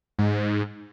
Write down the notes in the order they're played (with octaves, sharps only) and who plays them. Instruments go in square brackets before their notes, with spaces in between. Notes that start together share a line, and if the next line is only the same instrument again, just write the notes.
[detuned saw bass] G#2